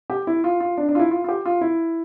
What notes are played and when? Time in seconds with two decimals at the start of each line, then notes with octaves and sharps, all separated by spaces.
0.10 G4
0.27 E4
0.44 F4
0.60 F4
0.78 D4
0.89 D4
0.95 F4
0.99 E4
1.11 F4
1.24 F4
1.29 G4
1.46 F4
1.61 E4